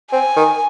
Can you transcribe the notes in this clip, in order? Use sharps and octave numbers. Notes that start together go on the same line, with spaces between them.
C4 G#5
D#3